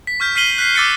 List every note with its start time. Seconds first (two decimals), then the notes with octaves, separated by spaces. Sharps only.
0.07 B6
0.20 C#6 F6 G6 B6
0.35 F6 B6 C7 D#7 F#7 G7
0.58 F#6 B6 C7
0.75 D6 E6 A6 B6 C#7 D#7